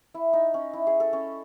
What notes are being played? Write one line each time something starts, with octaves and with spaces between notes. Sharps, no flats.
E4
D#4
C#4
E4
G#4
A4
C#4